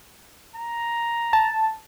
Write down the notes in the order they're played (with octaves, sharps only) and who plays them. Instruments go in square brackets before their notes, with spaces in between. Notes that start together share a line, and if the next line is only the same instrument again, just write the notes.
[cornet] A#5
[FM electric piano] A5